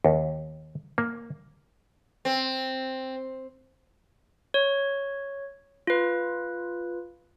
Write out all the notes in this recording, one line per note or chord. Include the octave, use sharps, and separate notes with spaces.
D#2
A#3
C4
C#5
F4 B4